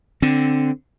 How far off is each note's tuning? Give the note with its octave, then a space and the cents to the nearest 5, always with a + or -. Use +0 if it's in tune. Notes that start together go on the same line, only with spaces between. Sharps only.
D3 +0 C4 +0